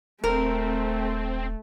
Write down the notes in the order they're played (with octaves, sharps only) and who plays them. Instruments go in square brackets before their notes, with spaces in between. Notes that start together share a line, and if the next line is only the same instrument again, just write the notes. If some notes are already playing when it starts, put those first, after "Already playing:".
[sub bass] D#1 [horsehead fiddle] A3 [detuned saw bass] C4 [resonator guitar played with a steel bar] A#4